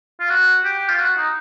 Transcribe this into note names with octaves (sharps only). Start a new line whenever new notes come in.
F4
F#4
G4
F4
F#4
D#4